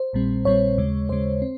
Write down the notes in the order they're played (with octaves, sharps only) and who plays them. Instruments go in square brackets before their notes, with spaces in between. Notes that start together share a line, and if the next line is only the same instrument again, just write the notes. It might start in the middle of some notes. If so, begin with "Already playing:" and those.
Already playing: [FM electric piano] C5
A#1 A#2 G3 C4
A#1 A#2 G3 C4 C#5
D#2 C#3 G#3
D#2 C#3 G#3 C5
C4